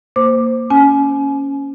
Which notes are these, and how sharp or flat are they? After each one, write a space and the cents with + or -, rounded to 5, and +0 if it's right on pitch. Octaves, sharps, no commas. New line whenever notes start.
A#3 -5 C5 -5 D6 +10
C#4 +0 G#5 +30